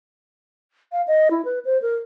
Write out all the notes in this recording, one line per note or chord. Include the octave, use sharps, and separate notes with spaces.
F5
D#5
E4
B4
C5
A#4